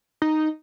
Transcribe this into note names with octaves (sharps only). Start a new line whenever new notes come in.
D#4